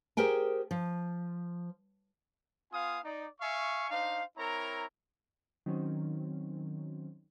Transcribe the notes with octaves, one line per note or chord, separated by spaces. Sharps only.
G4 G#4 A#4 C5 G5 G#5
F3
B3 F4 F5 G#5 D#6
D#4 D5
E5 F5 G#5 C#6
D4 D#4 C5 F5
C4 E4 A#4 C#5 A#5
D#3 F#3 C4 C#4